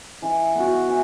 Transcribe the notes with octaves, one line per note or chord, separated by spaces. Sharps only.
E3
B3 F#4
E3